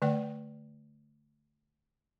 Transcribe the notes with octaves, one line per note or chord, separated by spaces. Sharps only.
D3 A3 D5 G5